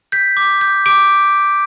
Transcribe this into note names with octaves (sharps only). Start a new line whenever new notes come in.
G6 B6
D6
G6
D6 D7